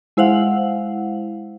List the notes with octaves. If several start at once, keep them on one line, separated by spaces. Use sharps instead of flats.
G#3 E4 C5 F5 F#5